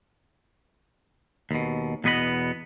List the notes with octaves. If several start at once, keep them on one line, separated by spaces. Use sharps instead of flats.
D#2 B2
E2 B2 B3 D#5 B5